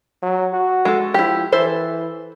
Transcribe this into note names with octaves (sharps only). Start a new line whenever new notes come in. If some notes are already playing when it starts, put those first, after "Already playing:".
F#3
F#4
G#3 A4
F3 E4 G4
E3 E4 A4 C5